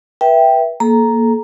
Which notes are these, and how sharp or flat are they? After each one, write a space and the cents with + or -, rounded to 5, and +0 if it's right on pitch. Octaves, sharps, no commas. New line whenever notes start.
B4 -25 E5 +0 G5 +0
A#3 +0 A4 -30 A#5 +0